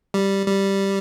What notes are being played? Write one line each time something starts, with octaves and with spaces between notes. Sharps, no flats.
G3
G3